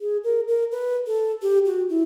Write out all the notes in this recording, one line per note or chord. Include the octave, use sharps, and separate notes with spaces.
G#4
A#4
A#4
B4
A4
G4
F#4
E4